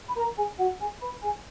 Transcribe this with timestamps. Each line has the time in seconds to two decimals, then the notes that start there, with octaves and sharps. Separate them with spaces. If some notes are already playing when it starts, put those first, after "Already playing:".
0.08 B5
0.16 A#4 A#5
0.37 G#4 G#5
0.59 F#4 F#5
0.80 G#4 G#5
1.01 B4 B5
1.23 G#4 G#5